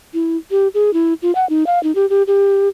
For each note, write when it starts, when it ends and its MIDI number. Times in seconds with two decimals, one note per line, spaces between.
0.14 0.37 64
0.51 0.68 67
0.74 0.93 68
0.93 1.14 64
1.22 1.34 65
1.35 1.48 78
1.50 1.64 63
1.67 1.81 77
1.83 1.94 63
1.95 2.08 67
2.10 2.23 67
2.27 2.68 67